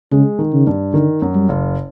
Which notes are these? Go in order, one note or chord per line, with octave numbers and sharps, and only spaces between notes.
C#3 G#3
D#3
C#3
G2
D3 D#3
F#2
G3
F#1